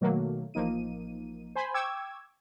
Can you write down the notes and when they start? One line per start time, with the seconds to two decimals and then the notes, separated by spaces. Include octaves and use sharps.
0.01 B2 D#3 F#3 A3 A#3
0.54 A1 F3 A#3 D#4 D#7
1.55 C5 G#5 B5 C6
1.74 G5 C#6 D6 E6 G#6